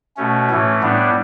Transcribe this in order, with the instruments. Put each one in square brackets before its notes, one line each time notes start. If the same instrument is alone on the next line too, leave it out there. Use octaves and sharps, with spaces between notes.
[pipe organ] B2 A3 C#4
A2 E3 A3
A2 G3 B3 D4